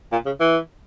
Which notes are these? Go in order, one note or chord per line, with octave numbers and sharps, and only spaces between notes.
A#2
C#3
E3